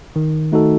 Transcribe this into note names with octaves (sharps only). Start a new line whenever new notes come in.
D#3
A3 D#4 F#4 A4